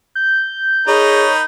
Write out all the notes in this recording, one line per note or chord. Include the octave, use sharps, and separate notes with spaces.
G6
D#4 G#4 A#4 C#5 B5